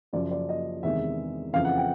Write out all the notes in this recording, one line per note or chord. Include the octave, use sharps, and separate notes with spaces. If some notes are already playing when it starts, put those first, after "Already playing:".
F#2 C#3 F3 D5
D5
D#5
E2 C3 D#3 G#3 E5
F2 C#3 E3 F5
F#5
G5